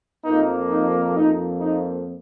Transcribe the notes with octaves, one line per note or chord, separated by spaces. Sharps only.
F2 F3 A#3 D#4
D#4
F2 F3 A#3 D#4
D#4